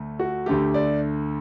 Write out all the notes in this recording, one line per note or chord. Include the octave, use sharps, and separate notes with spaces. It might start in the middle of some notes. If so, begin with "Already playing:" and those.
Already playing: D2 A3
F#4
D2 D3 A3 G4
D5